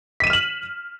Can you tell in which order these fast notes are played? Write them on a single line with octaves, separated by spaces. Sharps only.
B6 D#7 E7 F6 F#7